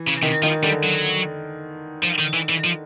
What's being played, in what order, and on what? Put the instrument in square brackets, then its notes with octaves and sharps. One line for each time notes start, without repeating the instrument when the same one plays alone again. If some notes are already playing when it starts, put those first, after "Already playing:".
Already playing: [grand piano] E3
[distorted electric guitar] C#3
[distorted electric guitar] C3 [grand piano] D#3
[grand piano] D#3 [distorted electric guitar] F3
[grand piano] D3 [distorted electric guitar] G3
[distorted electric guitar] F#3
F3
D#3
E3
E3
F3